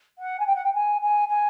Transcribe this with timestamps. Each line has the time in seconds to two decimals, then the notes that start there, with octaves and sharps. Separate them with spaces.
0.18 F#5
0.39 G#5
0.46 G5
0.55 F#5
0.64 G5
0.73 G#5
1.01 G#5
1.28 G#5